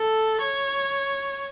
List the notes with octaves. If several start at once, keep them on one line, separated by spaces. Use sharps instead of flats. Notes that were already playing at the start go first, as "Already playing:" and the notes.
Already playing: A4
C#5